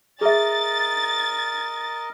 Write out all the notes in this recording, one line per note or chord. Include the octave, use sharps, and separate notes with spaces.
G#4 A#4 D#5 E5 A6